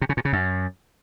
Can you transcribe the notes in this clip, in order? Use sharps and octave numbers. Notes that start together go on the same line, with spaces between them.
C3
C#3
A#2
C#3
F#2